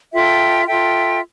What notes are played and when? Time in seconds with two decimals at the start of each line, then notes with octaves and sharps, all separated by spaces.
0.13 F4 A4 E5 G5
0.66 F4 A4 E5 G5